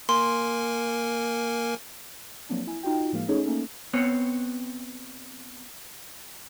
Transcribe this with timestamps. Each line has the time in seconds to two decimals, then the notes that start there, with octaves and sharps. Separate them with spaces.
0.09 A#3 A#4 G#5 C6
2.49 F3 F#3 A#3 C4 D4
2.67 E4 G#5
2.83 D#4 F4 F#4 G5
3.12 A2 F3 G#3 A#3 F5
3.28 A3 C#4 D#4 G#4 A4 C#5
3.45 A3 A#3 C#4 D#4 A4
3.93 B3 C4 C#5